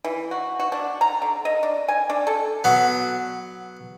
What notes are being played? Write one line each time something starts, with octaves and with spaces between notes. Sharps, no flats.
E3
F#4
F#4
D4
A#5
D3
D#5
D4
G#5
D4
A4
F#3 B3